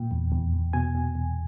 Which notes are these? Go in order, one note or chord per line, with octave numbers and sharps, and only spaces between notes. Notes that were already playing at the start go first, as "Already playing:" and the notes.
Already playing: A#2 G5
E2
E2
E2
B2 G#5
B2
E2